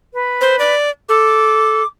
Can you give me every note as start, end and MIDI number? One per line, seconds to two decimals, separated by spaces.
0.13 0.74 71
0.41 0.56 72
0.59 0.90 74
1.09 1.83 69
1.09 1.86 86